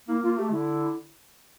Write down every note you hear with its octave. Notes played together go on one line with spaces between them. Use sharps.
A#3 E4
A#3 F4
A3 G4
D3 E4